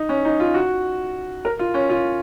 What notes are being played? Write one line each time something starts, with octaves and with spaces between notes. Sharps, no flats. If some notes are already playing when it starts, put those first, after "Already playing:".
Already playing: D#4
C#4
D#4
F4
F#4
A#4
F4
C#4
F4